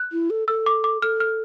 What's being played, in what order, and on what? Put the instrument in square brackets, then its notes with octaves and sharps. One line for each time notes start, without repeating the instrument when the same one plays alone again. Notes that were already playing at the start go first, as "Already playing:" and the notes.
Already playing: [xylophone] F#6
[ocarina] E4
A4
[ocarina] A4 [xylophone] E6
[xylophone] D6
D6
[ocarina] A4 [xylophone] F6
[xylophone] F6